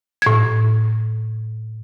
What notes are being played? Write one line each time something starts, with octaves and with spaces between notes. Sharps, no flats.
A2 G#6